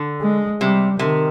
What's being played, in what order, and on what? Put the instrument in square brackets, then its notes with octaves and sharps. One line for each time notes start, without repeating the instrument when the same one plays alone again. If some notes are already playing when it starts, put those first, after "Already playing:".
Already playing: [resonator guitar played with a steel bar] D3
[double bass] G#3
[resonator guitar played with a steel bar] C3 [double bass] G3
[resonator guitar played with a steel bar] C3 [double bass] D#3